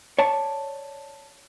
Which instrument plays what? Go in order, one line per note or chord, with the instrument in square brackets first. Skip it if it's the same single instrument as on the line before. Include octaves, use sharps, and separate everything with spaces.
[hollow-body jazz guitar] C#5 D5 A5